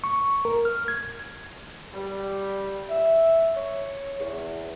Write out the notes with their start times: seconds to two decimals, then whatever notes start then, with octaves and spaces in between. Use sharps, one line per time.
0.04 C#6
0.45 A#4
0.65 F6
0.88 G#6
1.94 G3
2.89 E5
3.56 C#5
4.20 E2